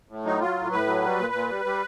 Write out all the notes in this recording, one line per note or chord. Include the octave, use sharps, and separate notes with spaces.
A2
F#3 D#4
F#3 F4
A2
A2 B4
F#3
G3
A#2
A#2
G3
G3